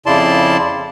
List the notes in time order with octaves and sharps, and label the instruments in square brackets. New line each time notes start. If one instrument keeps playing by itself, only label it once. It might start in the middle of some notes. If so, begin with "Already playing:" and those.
[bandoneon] F2 C#3 E4 D5 A5 C6